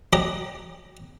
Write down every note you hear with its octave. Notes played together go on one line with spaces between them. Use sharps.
F#3 G4 D#5